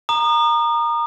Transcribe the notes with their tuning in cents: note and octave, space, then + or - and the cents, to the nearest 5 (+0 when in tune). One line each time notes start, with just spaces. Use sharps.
A#5 +0 D#6 -35